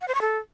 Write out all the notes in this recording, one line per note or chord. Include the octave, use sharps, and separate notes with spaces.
F#5
C5
C#6
A4